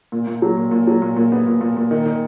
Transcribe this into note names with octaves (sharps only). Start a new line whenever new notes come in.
A#2
A#2
F#3
A#2
A#2
F#3
A#2
A#2
B3
A#2
A#2
A#2
D#3
D#3